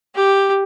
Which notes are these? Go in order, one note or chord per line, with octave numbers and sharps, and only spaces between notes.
G4